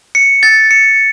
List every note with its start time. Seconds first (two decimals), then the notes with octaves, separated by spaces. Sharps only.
0.15 C#7
0.43 A6
0.71 C#7